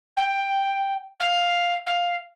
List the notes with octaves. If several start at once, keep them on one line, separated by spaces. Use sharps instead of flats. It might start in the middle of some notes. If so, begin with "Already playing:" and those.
G5
F5
F5